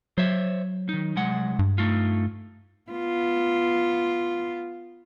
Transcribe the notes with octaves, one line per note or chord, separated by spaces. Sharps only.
F#3 C5 C#5 E5
D#3 D#4
C2 G#3 F#5
G2
A3 D#4 F4
B3 F4